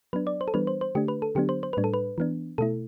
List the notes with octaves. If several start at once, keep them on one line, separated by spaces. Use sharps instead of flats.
F#3 B3 D4 B4
D5
C5
A4
E3 G3 B3 D4 B4
C5
C5
D3 A3 D4 G4
B4
A4
D3 F#3 B3 D4 G4
C5
C5
A2 G3 D4 B4
A4
B4
E3 B3 D4
B2 A3 E4 A4